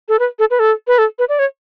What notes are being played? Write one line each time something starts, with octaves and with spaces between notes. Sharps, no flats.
A4
B4
A4
B4
A4
B4
A4
B4
D5
C#5